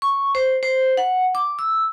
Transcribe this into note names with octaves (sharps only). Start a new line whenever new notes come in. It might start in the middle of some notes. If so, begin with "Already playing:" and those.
C#6
C5
C5
F#5
D6
E6